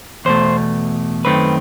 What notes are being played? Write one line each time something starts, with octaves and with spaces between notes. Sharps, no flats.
E2 B2 A3 C5
F#2 D#3 A3 C4 B4